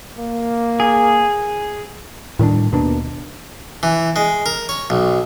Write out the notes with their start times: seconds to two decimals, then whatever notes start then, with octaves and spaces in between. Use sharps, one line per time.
0.19 A#3
0.80 G#4
2.39 A2 D#3 G3 D4
2.72 D#2 B2 A#3 D4
3.83 E3
4.16 G#3
4.46 A#4
4.69 C#5
4.90 B1